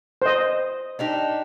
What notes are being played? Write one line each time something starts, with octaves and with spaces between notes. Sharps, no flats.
C5 D#5
D4 D#4 G4